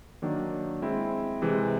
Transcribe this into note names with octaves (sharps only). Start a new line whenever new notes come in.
D#3 F#3 A#3 D4
G#3 C4 E4
C3 E3 G#3